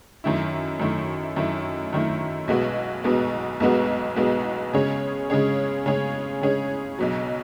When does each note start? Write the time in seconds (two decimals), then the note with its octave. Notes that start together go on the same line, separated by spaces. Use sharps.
0.24 F#2 D#3 A3 E4
0.79 F#2 D#3 A3 E4
1.36 F#2 D#3 A3 E4
1.93 F#2 D#3 A3 E4
2.48 B1 B2 G#3 B3 F#4
3.04 B1 B2 G#3 B3 F#4
3.60 B1 B2 G#3 B3 F#4
4.16 B1 B2 G#3 B3 F#4
4.73 C#3 G#3 C#4 G#4 C#5
5.30 C#3 G#3 C#4 G#4 C#5
5.86 C#3 G#3 C#4 G#4 C#5
6.41 C#3 G#3 C#4 G#4 C#5
6.99 B1 B2 F#3